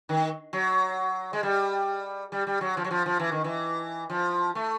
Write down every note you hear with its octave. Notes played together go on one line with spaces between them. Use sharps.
D#3
F#3
G#3
G3
G3
G3
F#3
F3
F#3
F3
F3
E3
D#3
E3
F3
A3